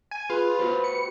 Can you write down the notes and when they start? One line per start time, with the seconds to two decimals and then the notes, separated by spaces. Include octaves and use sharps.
0.11 G#5
0.30 F4 G#4 B4
0.59 F#4 G4 C5
0.84 C#7